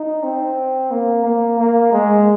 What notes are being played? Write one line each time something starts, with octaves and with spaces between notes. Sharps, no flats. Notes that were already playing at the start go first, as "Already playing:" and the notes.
Already playing: D#4
C4
A#3
A#3
A#3
G#3